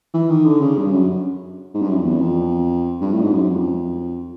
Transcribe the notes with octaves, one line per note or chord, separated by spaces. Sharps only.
E3
D#3
D3
C#3
G2
F#2
G#2
G2
F#2
F2
E2
F2
G2
A2
G#2
F#2
F2